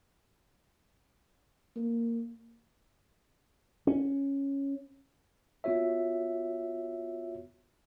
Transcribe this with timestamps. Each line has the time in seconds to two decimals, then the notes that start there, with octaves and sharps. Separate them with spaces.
1.76 A#3
3.87 C#4
5.64 B3 F4 F#4 C#5 E5